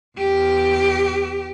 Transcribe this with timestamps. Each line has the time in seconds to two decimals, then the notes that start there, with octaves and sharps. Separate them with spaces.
0.18 E2 G4